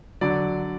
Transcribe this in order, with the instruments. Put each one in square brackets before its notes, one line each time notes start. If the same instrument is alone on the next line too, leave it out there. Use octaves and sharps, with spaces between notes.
[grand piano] D3 F#3 D5